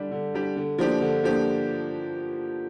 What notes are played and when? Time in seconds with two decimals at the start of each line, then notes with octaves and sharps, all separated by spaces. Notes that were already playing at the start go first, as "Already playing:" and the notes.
Already playing: D3 G3 D4 G4
0.11 D3
0.34 G3 D4 G4
0.56 D3
0.78 F3 A#3 D4 G4
1.01 D3
1.24 F3 A#3 D4 G4